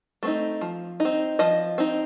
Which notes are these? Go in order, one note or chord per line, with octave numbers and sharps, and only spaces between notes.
A3 C4 D#4
F3
D#4
C4
F3 D#5
C4 D#4